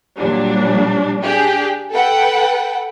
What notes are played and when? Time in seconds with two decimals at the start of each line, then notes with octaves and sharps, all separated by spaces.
0.18 A#2 F#3 G3 D4
1.22 D4 G4 G#4
1.91 A4 B4 F#5 G5